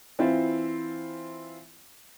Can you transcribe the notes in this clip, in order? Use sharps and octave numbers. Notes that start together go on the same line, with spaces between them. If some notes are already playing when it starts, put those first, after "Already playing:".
E3 C4 E4 F4 C5